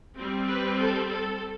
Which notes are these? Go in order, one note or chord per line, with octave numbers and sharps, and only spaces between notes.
G3 C4
B4
A4
A4